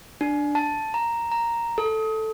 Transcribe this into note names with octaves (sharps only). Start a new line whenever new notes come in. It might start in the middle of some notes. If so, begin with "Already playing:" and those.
D4
A5
A#5
A#5
A4